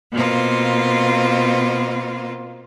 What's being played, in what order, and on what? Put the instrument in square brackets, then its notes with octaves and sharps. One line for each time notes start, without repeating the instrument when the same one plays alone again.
[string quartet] B2 A#3 C4 F4